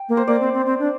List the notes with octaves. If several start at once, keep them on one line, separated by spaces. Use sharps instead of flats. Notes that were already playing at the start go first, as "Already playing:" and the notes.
Already playing: G5
A#3
C5
A#3 D5
C4
C4
C4
D4